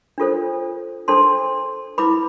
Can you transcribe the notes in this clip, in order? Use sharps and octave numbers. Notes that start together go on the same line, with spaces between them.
D4 F4 A4 C5
D4 A4 C5 A5 C6
E4 B4 B5 D6